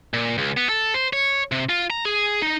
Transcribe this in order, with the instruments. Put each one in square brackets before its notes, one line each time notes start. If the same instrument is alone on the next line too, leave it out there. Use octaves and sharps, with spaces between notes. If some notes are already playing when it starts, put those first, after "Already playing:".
[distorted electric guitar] A#2
C#2
B3
A4
C5
C#5
C3
F4
A#5
G#4
D#4